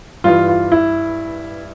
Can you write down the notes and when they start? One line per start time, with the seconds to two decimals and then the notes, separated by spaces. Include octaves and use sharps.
0.24 G2 E3 F4
0.48 F4
0.72 E4